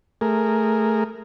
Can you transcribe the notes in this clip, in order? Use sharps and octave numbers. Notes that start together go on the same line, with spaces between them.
A3 G#4 A#4